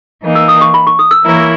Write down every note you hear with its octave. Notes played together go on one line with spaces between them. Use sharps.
E3 A#3 D#4
E6
D#6
C#6
B5
C#6
D#6
E6
E3 A#3 E4 A#4 C#5